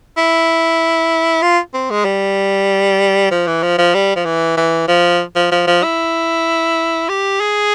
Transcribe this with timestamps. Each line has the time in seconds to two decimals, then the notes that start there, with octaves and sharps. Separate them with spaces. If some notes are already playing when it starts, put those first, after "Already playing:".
0.17 E4
1.42 F4
1.74 C4
1.90 G#3
2.05 G3
3.31 F3
3.47 E3
3.63 F3
3.78 F3
3.94 G3
4.16 F3
4.25 E3
4.57 E3
4.88 F3
5.36 F3
5.51 F3
5.67 F3
5.83 E4
7.09 G4
7.40 G#4